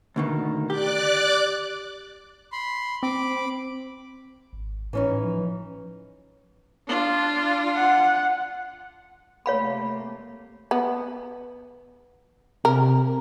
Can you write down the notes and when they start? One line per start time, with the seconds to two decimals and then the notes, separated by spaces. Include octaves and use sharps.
0.16 D2 B2 D#3
0.70 G4 D5 D6 F#6
2.52 B5 C6
3.03 C4 B5 D6
4.53 G#1
4.93 A2 E3 C#4 D#4
5.24 F3
6.88 D4 F4
7.75 F#5
9.46 C3 A3 A#3 C#5 F5 B5
10.71 B3
12.65 C3 A#4